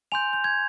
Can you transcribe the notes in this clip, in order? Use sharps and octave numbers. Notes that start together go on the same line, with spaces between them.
G#5 C6 G6 F7
G6
G#6